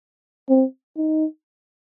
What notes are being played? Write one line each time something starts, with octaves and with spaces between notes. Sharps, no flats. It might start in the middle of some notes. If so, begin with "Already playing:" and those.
C4
D#4